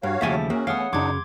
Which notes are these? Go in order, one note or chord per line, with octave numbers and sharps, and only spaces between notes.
G2 F#4 C#5 F5
D#2 C#3 F3 A3 A4 E5 G5 G#5
A#3 C#4 F#4 G#4
A3 B3 C#5 F5 F#5 D#6
F#2 C#3 D4 D#4 C6 D6 G#6